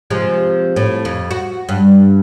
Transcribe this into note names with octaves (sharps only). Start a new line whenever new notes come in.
C3 F3 G#3
A2
F2
F#4
G2